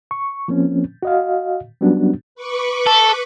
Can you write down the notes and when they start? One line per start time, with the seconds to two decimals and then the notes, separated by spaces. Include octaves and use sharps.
0.11 C#6
0.48 F3 A#3 C4 C#4
1.03 F#4 D#5 F5
1.81 F#3 G3 B3 C#4 D4 F#4
2.35 B4 C#6 D6
2.86 A4